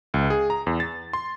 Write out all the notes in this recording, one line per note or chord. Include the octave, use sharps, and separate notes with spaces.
C#2
G#4
A#5
E2
A6
C6